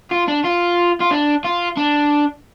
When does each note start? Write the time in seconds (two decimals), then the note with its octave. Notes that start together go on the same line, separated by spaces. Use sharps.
0.11 F4
0.28 D4
0.45 F4
1.01 F4
1.11 D4
1.45 F4
1.77 D4